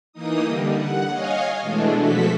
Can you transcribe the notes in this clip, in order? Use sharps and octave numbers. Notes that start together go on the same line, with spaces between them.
E3 A#3 D#4 D#6
D3 G3
F#5
C#5 D#5 F5 G#5
B2 E3 G#3 A3 D4
F3 F#4 A4 B6